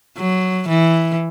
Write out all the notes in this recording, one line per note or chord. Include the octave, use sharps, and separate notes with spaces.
F#3
E3